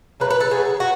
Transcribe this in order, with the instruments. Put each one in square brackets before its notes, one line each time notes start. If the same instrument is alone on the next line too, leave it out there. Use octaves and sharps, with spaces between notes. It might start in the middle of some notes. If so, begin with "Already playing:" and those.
[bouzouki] C#3 F#3 A3 B4
B4
A4
C#3 F#3 A3 G#4
F#4